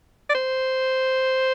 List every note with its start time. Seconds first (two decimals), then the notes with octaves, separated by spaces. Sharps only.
0.29 D5
0.34 C5